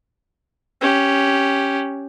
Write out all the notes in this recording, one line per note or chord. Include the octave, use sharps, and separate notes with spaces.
C#4 G4